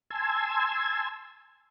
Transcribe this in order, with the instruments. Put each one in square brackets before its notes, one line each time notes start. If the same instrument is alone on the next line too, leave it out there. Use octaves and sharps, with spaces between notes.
[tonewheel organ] G#5 A5 C6 E6 G#6